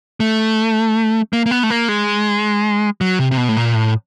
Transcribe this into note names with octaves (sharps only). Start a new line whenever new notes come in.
A3
A#3
A#3
B3
A3
A#3
G#3
F#3
C3
C3
B2
A2
A#2
A2